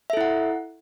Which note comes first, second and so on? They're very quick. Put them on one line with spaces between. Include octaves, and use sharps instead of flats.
E5 A4 E4 F#5